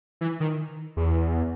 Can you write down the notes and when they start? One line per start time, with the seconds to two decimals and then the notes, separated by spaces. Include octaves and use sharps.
0.21 E3
0.40 D#3
0.97 E2